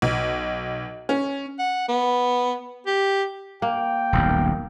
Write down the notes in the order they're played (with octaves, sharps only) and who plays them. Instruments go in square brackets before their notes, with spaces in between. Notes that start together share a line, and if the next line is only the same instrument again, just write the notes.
[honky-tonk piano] B1
C#4
[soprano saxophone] F#5
B3
G4
[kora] A#3 [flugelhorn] G5
[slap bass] D#1 B1 F#2